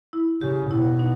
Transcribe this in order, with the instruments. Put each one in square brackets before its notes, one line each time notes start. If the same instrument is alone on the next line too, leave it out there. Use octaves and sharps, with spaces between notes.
[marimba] E4
[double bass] C#3 [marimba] G4
[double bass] B2 [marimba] E4
[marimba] D#4